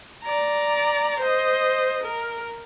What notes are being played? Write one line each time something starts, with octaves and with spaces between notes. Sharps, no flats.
D5 A#5
C5 D#5
A#4